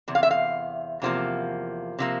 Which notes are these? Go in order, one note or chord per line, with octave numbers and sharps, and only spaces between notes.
E2 C3
F5
E5
F5
E2 C3 F3 A#3
C3 F3 A#3